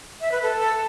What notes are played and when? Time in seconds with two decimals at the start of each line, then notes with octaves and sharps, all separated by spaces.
0.21 E5
0.32 B4
0.42 A4